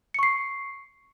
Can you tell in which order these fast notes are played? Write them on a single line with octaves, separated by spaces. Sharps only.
C#7 C#6 C7